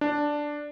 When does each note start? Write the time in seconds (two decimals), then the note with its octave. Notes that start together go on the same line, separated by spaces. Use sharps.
0.01 D4